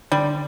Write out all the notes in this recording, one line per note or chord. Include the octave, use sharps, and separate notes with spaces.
D3 G3